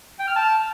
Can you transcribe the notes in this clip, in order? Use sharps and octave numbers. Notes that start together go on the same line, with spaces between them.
G5
F6
A5